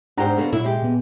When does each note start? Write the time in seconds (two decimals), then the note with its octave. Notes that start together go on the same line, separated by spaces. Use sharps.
0.17 G#2 D4 G4 C5 F#5 A#5
0.37 B2 D3 A#3
0.53 A#2 F#3 E4
0.64 G#3 G4
0.83 A#2 B3